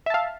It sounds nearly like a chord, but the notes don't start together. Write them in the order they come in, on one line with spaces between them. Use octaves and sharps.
E5 A5 F5